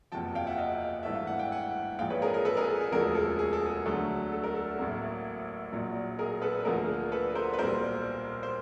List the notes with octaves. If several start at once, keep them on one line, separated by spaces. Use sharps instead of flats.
F#1 E2 C3 F3 G5 A5
F5 G5
E5 F#5
D#5 F5
G#1 G2 E3 A3 E5
F5
F#5
G5
F#5 G#5
A#1 G#2 F3 F5 G5
B4 C#5
G#4 A#4
G#4 A#4
A4 B4
G#4 A#4
A4
G#4
E1 D2 C#3 F3 A#4
A4
G#4
A4
G#4
A4
G#4
D2 D3 F#3 A3
A4
A#4
A4
A1 A2 F#3 A#3
A#1 A#2 F#3
G#4 A#4
A4 B4
D2 D3 F3 A#3 G#4 A#4
A4 B4
A#4 C5
B4
B1 A#2 G3 A#3 A#4 C5
C5